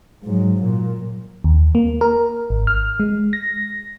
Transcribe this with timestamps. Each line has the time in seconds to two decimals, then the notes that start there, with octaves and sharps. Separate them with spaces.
0.24 G#2 F#3
0.63 A#2
1.44 D#2
1.75 A#3
2.01 A#4
2.50 G#1
2.67 F6
3.00 G#3
3.33 A#6